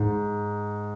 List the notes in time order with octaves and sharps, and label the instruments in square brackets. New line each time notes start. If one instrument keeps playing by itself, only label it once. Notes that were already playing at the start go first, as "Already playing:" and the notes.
Already playing: [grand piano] G#2